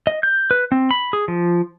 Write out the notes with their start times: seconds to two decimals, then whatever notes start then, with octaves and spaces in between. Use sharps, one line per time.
0.07 D#5
0.23 G6
0.51 B4
0.72 C4
0.91 B5
1.13 G#4
1.28 F3